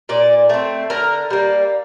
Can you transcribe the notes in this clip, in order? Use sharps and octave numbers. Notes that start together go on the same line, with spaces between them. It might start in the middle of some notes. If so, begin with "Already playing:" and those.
A#2 D5
A3 C4
D3 A#4
G3 A#3